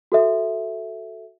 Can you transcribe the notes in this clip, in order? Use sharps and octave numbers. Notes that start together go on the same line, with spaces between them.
F#4 A4 E5